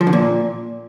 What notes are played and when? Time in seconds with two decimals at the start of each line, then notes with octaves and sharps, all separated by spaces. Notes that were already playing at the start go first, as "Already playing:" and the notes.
0.01 F3
0.07 D3
0.13 A#2